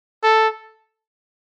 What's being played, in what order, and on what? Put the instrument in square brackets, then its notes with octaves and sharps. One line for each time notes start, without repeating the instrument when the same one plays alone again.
[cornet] A4